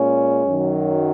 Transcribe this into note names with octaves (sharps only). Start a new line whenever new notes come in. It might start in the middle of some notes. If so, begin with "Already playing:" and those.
Already playing: A#2 G#3 C#4
F#2 D#3 F#3